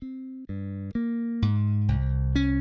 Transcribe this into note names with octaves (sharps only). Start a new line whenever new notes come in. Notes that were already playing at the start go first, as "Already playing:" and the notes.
C4
G2
A#3
G#2
C2
C#4